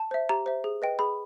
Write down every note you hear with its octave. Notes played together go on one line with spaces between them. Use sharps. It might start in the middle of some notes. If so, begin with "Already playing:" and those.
Already playing: A5
C5 E5
G4 A#5
C5 E5
G#4
B4 D#5 G5
G#4 B5